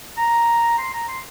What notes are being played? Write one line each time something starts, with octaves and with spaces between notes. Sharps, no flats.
A#5
C6
A#5
C6